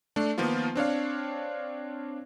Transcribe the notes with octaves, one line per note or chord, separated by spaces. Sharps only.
A3 D4
D#3 F3 A#3 B3 F4
C4 D4 C#5 F5